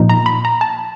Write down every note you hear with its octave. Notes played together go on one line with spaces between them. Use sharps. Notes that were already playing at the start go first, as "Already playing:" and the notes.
Already playing: A#2 F3 A#3 D#4
A#5
B5
A#5
A5